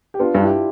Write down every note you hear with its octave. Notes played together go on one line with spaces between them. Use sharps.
G4
B3 D4 F4
G2
E4 G4